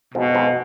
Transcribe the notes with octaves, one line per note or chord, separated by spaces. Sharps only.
F2 G#2 B2
F2 G#2